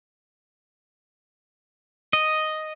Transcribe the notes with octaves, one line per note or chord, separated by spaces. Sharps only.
D#5